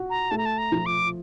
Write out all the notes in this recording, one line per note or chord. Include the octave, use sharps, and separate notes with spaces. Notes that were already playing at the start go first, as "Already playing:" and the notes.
Already playing: F#4
A#5
A3 A5
A#5
A5
A#5
F3
D6